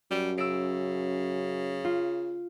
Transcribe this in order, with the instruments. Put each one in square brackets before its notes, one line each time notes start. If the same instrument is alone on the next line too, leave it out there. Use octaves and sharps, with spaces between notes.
[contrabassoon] F#2 [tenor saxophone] G3
[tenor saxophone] C#3 [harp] E6 D7
[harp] F4